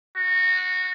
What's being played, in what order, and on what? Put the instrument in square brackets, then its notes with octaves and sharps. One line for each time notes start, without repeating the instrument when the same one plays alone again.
[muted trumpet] F#4